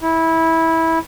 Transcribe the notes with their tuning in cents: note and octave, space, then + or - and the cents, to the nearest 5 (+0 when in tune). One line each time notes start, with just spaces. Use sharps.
E4 -15